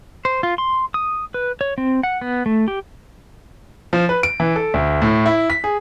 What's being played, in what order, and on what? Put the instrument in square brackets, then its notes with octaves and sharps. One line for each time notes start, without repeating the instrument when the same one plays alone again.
[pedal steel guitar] C5
F4
C6
D#6
B4
C#5
C4
F#5
B3
A3
G4
[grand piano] F3
B4
D7
E3
A4
D2
A2
E4
B6
G#4